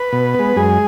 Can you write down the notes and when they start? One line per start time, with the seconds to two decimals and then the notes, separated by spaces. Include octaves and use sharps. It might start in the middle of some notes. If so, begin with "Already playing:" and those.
Already playing: B4
0.13 B2
0.34 G#3 B3
0.56 F#2 G#3 G#4